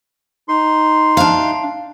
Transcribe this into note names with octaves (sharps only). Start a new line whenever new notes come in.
D#4 C6
D4 F5